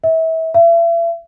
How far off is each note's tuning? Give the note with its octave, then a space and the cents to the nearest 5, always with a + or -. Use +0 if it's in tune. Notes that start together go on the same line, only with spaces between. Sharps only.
E5 -30
E5 +40